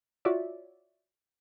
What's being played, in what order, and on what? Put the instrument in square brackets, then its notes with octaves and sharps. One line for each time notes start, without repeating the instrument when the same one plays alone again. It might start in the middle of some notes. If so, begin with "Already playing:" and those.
[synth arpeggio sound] F4 F#4 C#5 D5 E5